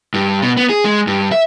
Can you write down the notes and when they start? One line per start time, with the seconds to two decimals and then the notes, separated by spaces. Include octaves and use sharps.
0.14 G2
0.42 B2
0.57 B3
0.69 G#4
0.85 G#3
1.07 G2
1.32 E5